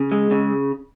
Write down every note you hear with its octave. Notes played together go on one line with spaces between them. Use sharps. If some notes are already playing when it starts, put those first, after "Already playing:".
Already playing: C#3
G#3
C#3